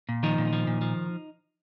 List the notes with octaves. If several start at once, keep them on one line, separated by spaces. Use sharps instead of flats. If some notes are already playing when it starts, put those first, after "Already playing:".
A#2
D#3 F3 D#4
A#2
F3
A#2
F3